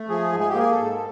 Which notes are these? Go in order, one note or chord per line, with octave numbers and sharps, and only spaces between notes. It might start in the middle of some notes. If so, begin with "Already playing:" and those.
Already playing: A3
F3 G#4
G#2
G#4
G4
A#3 G#4
A4
G#2